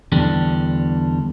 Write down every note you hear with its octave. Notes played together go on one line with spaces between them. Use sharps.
E2 D3 G3 D4